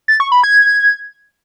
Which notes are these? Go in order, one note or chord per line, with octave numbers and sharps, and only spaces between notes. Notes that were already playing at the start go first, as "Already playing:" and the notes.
A6
C#6
B5
G#6